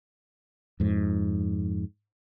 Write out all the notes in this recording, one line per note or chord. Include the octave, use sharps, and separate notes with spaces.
F2 G#2